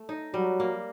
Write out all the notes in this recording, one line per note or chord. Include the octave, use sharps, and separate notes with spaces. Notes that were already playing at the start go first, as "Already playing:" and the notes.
Already playing: A3
D#4
F#3 G3
A#3